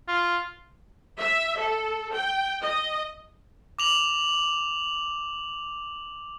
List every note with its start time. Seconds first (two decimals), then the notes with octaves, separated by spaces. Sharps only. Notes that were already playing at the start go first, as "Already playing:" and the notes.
0.08 F4
1.18 E5
1.58 A4
2.13 G5
2.62 D#5
3.79 D6 F7 F#7